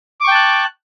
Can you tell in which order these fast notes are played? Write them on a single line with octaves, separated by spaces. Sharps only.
D6 C#6 G5 A5 F#6